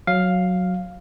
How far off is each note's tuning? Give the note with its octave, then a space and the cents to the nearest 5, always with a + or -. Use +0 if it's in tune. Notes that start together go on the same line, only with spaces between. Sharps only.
F#3 -5 F5 +0